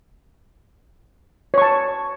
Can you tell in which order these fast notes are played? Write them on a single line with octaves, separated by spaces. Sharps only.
C#5 C#6 A5